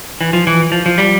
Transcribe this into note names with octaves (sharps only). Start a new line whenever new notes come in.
E3
F3
E3
F3
F3
G3